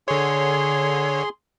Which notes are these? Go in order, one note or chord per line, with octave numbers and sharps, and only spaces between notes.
D3 G#4 C#5 C6